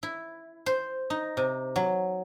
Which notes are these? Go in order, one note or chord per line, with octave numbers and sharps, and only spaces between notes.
E4
C5
D#4
C3
F#3